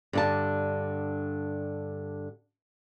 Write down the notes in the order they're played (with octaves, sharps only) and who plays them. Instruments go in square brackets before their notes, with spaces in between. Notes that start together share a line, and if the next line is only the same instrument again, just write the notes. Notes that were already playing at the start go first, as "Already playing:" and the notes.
[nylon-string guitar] G2 D3 A5